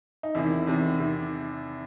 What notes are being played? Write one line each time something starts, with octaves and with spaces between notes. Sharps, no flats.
D#4
E2 C3 D#3 E4
E2 C3 D#3
C3 D#3